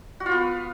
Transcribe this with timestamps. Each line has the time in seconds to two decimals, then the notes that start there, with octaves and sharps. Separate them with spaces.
0.20 F#4
0.26 F4
0.31 B3